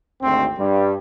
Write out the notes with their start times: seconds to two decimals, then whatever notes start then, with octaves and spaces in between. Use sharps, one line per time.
0.23 G#1 D2 C4
0.59 G2 G3